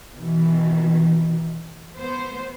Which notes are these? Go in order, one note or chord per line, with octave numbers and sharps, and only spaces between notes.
B2 D#3 E3
B3 C5